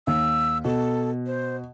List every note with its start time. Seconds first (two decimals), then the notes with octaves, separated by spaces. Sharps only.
0.07 D#2 E6
0.65 B2 A4
1.26 C5